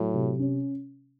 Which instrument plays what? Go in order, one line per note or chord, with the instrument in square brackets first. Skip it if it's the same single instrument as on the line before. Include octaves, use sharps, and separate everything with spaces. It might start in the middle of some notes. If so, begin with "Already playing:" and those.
Already playing: [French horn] A2 [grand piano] F#3
[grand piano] C3
C#4